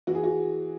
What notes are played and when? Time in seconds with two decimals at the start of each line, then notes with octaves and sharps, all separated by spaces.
0.07 E3 F#4
0.15 G#4
0.24 F#4